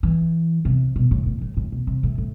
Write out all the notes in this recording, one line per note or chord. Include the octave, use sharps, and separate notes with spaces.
E3
C3
B2
A2
A2
A2
A2
B2
C3
A2
A2